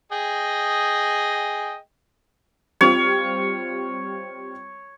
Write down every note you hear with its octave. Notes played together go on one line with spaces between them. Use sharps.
G#4 D#5 G5
G3 C4 F4 C#5